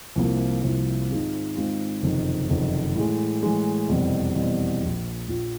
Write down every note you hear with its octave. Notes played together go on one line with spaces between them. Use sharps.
C2 C3 F3 A#3
C2 C3 F3 A#3
G#2 D#3 G#3 C4 F4
G#2 D#3 G#3 C4 F4
F#1 F2 C3 D#3
F#1 F2 C3 D#3
A2 E3 G#3
A2 E3 G#3
F1 E2 B2 G3 C4
F1 E2 B2 G3 C4
A#1 A#2 F3
A#1 A#2 F3